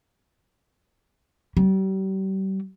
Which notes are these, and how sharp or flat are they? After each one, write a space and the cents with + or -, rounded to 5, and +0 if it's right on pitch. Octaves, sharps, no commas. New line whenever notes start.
G3 -40